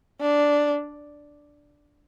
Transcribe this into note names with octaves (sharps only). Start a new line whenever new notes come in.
D4